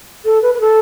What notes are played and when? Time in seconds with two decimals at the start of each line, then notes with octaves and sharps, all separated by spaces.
0.25 A4
0.42 B4
0.54 B4
0.60 A4